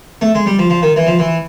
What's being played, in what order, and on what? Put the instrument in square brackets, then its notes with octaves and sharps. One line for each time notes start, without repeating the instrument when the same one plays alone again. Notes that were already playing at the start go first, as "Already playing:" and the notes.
[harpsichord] A3
G#3
G3
F3
F3
D#3
E3
F3
E3